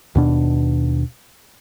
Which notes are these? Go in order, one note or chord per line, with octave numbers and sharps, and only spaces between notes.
D#2 B2 D4